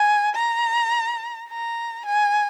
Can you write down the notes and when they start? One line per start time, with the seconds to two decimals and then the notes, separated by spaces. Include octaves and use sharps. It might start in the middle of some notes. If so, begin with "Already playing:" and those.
Already playing: G#5
0.34 A#5
1.49 A#5
2.06 G#5